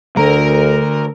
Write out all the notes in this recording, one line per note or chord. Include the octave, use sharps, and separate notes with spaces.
D2 D3 A3 A#4 A#5